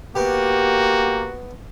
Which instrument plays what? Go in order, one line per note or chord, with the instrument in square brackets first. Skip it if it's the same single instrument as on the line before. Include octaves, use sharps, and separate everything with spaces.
[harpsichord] B2 B3 [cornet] A#3 [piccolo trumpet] F#4 [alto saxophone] G4